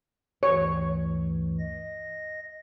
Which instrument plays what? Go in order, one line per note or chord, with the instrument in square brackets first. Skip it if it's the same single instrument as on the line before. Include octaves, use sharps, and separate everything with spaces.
[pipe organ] D2 G2 E3 [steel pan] C#5
[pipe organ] D#5 A#6